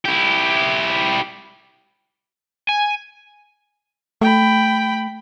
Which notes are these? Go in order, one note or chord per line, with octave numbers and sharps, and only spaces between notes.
E4 G4
G#5
A3 G5 B5